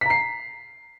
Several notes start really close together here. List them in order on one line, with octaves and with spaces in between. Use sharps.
B6 A#5 C7